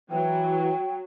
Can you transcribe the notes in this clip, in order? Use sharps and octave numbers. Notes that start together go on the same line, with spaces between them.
E3 F#3 G5